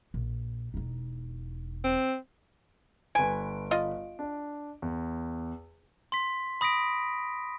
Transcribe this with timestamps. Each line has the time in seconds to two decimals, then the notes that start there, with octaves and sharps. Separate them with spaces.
0.14 A#1
0.74 E1 D#4
1.84 C4
3.15 G1 B4 G#5 D7
3.71 F4 D#5
4.19 D4
4.82 E2
6.12 C6 B6
6.61 B5 D#6 A#6 B6 D7